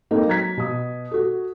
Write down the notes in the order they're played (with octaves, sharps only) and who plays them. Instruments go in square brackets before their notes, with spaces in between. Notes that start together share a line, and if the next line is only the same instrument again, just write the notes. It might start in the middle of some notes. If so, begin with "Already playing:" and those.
[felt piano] A#3 C4 D#4 A4 A#4
F#3 A#5 G#6 B6
B2 D#6
F#4 A4